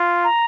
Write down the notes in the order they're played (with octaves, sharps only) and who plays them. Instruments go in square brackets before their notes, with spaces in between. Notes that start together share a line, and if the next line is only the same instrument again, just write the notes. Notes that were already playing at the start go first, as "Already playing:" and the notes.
Already playing: [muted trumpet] F4
[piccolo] A#5